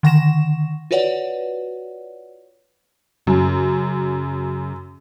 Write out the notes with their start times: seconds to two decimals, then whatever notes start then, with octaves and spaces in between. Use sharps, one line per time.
0.03 D3 D#3 F#5 C#6 A#6 E7
0.91 F4 F#4 B4 C#5 D5 F#5
3.27 F#2 C#3